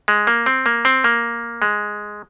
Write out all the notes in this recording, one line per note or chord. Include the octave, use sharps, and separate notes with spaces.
G#3
A#3
C4
A#3
C4
A#3
G#3